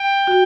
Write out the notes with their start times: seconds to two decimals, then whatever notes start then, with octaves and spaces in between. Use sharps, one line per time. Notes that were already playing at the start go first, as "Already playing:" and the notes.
Already playing: G5
0.27 F#4